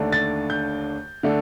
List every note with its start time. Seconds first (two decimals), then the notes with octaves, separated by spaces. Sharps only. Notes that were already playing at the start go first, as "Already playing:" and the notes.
Already playing: D#2 D3 A3 D4
0.12 A6
0.50 G6
1.23 D3 A3 D4